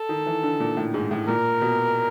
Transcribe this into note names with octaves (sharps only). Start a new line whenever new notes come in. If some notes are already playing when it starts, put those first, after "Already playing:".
Already playing: A4
D#3
E3
D3
A#2
A2
G#2
A2
A#2 A#4
B2